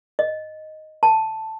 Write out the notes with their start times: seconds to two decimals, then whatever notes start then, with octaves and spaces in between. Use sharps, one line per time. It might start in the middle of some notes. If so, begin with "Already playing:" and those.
0.19 D#5
1.03 A5